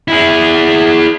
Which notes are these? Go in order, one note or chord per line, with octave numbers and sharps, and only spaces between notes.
E4 G#4